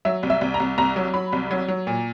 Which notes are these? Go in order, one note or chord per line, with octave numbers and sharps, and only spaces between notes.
F#3 E5
C2
E5
C2
A#5
C2
C2 A#5
F#3
F#3 B5
C2
F#3
F#3
A#2